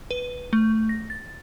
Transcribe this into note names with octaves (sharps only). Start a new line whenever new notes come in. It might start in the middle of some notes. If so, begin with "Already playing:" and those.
B4
A3
A#6
A6